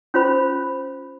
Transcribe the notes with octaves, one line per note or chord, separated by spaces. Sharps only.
C#4 F4 C5 B5